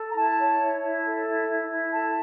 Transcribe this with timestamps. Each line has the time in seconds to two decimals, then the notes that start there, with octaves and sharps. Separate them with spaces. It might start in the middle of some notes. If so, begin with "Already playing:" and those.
Already playing: A4
0.09 A#5
0.15 E4 A5
0.38 C#5
0.60 E4
0.82 E4
1.04 A4
1.26 E4
1.48 E4
1.69 E4
1.91 A4 A5